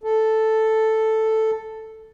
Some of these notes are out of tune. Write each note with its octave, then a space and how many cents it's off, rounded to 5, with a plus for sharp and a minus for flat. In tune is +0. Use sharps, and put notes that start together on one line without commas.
A4 +0